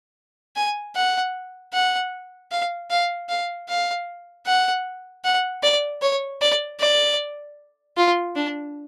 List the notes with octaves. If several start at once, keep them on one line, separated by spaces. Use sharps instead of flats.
G#5
F#5
F#5
F5
F5
F5
F5
F#5
F#5
D5
C#5
D5
D5
F4
D4